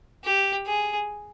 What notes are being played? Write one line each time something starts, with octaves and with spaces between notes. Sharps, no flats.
G4
G#4